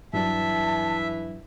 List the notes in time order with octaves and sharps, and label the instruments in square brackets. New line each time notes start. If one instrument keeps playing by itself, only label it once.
[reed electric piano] G2 F#3 D4 [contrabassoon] E3 [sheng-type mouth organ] E5 [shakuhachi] A5